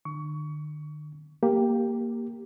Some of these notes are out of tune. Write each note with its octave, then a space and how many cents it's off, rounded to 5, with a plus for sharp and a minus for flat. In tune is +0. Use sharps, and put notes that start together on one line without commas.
D3 +45 C#6 +20
A#3 +0 G4 +5